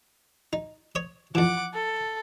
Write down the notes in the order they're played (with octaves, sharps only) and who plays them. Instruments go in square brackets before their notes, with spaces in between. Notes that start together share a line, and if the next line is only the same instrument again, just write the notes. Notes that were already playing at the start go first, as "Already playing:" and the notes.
[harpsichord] D#4
C#5 D#6
[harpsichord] F2 E3 [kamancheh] F#5 D6
[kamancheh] A4